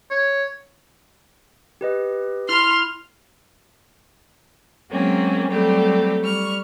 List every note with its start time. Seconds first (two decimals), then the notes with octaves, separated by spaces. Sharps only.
0.11 C#5
1.81 G4 B4 D#5
2.49 E4 B5 C6 F6
4.90 F#3 G#3 A#3 C4 C#4
5.49 F#3 G3 A3 C4 G4
6.24 G3 C#6 F6